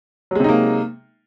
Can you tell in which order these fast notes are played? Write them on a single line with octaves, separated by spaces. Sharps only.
F#3 G#3 C3 D#4 A#3